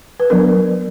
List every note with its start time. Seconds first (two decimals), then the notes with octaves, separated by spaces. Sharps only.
0.20 B4
0.30 F#3 B3 D4 A#4